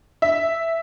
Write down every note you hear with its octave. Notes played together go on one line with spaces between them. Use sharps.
E5